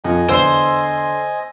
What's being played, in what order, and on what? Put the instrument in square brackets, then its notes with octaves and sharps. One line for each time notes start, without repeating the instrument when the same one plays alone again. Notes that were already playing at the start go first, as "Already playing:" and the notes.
[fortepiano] F2 [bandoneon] D#5 G#5
[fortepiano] E2 E3 [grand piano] D3 E6 [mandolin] C5